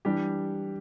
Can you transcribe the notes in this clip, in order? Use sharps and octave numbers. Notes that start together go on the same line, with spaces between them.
E3 G3 D4 G4